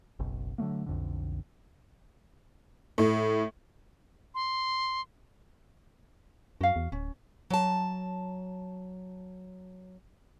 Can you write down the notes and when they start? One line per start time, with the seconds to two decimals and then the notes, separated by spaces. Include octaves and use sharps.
0.19 F#1 B1
0.58 D3 F#3 A3 A#3
0.86 B1 F2 D3
2.98 A2
4.35 C6
6.61 F#2 F#4 F5
6.76 E2
6.92 D1 C#4
7.50 F#3 A5